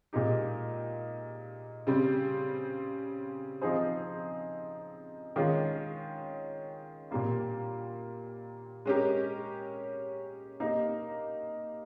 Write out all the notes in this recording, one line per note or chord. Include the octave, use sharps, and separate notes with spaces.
A#2 G#3 D#4 G4
C#3 G3 C4
F3 C4 D#4 G#4 C5
D#3 G#3 C#4 F4
A#2 G3 A#3 F4
G#3 C#4 G4 A#4
A#3 D#4 G4 A#4